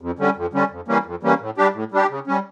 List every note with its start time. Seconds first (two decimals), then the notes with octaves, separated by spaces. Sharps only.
0.01 F2
0.19 D3 G3 C#4
0.36 F2
0.53 D3 G3 C#4
0.71 F2
0.88 E3 G3 A#3 C#4
1.06 F2
1.23 E3 G3 A#3 C#4
1.40 A2
1.57 G3 D4 G4
1.74 A2
1.92 G3 D4 G4
2.10 C#3
2.27 G3 C#4